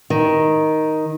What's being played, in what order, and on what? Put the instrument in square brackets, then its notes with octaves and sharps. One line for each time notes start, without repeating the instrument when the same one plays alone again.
[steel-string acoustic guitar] D#3